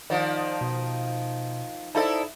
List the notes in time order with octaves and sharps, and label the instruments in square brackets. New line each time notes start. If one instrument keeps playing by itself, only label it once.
[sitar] D#3 F3 [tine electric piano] D5
[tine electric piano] B2
[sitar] D#4 E4 A4 [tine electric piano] C5 D5 A5